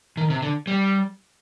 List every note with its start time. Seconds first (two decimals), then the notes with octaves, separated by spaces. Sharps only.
0.17 D#3
0.30 C3
0.42 D3
0.67 G3